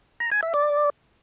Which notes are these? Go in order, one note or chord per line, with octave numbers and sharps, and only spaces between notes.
A#5
G#5
E5
D5